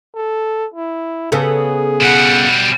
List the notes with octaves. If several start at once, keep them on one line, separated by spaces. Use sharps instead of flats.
A4
E4
C#3 B3 G#4 A4
B2 G3 F#5